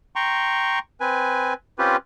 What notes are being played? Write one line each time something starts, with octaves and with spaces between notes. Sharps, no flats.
G5 A#5 C6 C#6
C4 B4 G#5
C4 C#4 F4 G4 B4